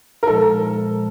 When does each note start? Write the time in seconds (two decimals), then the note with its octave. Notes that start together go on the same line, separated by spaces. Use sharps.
0.23 A#4
0.27 A#2 F3 G#3 A4